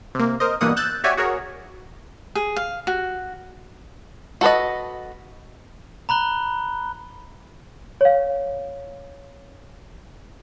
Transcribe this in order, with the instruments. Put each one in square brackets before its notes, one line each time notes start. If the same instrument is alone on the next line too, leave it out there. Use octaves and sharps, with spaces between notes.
[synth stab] C3 A#3
A#4 C5 D#5
G2 B2 E3 A#3 F#5 D#6
E6 F#6 G6 A6 E7
F#4 G4 C#5 D5 E5 G#5
F#4 G#4 A#4 C#5
[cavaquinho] G#4
F5
F#4
[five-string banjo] F#4 A4 B4 D#5
[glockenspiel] A#5 B5 F#6 G7
[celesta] C#5 F5